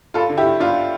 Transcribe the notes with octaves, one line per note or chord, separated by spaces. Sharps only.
G2 F4 A4
D3
E4 G4
G2
G2 D4 F4